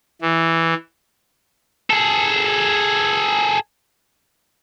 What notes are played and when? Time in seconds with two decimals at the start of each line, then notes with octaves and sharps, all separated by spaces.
0.21 E3
1.90 G#4 A4